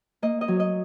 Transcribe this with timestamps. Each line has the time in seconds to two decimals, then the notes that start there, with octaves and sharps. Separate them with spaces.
0.22 A#3 D#5
0.41 D#5
0.48 F#3
0.60 D#5